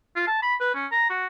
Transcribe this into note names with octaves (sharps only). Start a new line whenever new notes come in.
F4
A5
B5
B4
C#4
A#5
F#4